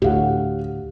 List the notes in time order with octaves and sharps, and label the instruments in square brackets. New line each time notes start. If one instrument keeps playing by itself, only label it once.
[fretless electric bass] D2 A2 [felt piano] G4 F5 F#5